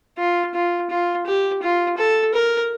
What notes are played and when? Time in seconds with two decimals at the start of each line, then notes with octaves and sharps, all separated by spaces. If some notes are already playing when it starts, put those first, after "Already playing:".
0.18 F4
0.55 F4
0.90 F4
1.27 G4
1.63 F4
1.98 A4
2.34 A#4